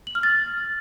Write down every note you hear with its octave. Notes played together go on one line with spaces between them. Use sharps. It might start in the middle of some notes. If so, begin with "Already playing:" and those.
F#7
F6
A6